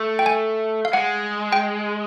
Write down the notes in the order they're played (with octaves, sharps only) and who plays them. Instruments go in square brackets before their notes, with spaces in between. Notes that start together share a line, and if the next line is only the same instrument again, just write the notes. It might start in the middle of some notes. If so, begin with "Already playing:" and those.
Already playing: [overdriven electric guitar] A3
[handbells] G5
G#5
F5
[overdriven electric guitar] G#3 [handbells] F#5
[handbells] G5